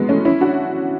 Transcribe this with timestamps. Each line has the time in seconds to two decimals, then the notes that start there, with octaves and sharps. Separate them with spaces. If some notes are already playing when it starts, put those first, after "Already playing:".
Already playing: E3 F#3 G#3 B3
0.09 A3 C#4
0.25 C#4 E4
0.41 D4 F#4